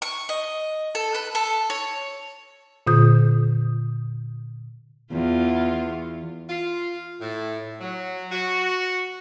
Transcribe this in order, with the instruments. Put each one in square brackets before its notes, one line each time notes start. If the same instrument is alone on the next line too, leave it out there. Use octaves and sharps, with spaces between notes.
[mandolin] C#6
D#5
A4
B4
A4
C#5
[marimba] A#2 D3 F4 D#6 G6
[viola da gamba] E2 F4
[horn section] F4
A2
F#3
F#4